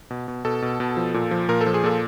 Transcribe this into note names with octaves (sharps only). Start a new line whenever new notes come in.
B2
B2
B2 A4
B2
B2
F3
A#2
F3
A#2 A#4
A4
F3
G#4
A#2 A4